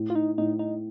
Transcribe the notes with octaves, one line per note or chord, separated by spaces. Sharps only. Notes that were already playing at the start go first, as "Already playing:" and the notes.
Already playing: A2
F4
D#4
A2 D#4
D#4